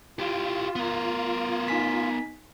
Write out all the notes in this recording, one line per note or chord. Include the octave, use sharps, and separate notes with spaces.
E4 F4 G4
B3 A#4
D#4 G#5 B6